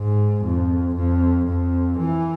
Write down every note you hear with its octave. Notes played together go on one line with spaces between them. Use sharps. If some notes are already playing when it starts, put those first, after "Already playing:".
Already playing: G#2
F2
F2
F2
E3